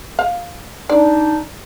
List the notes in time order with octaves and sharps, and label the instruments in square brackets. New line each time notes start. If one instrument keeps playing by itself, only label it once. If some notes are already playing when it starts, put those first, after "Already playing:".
[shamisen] F5
[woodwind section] D4 D#4 [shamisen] D5